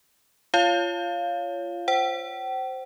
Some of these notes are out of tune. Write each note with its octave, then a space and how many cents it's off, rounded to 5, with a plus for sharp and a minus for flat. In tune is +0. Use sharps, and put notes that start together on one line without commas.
F4 -20 C#5 +10 F5 +0
C5 +0 G5 -45